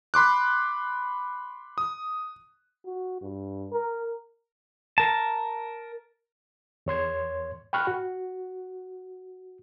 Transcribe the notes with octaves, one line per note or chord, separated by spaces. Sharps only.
B5 C6 D6 F#6
D#6
F#4
G2
A#4
A#4 A5
E2 C#5 C6 G#6
G5 B5 C#6 F6 F#6
F#4